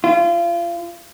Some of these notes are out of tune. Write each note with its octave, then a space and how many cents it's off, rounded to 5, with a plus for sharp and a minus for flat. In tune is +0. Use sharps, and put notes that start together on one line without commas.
F4 -30